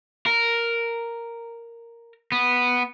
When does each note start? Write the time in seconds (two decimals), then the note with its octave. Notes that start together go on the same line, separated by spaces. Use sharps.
0.26 A#4
2.32 B3